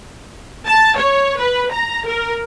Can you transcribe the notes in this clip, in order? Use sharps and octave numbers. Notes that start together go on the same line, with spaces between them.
A5
C#5
B4
A#5
A#4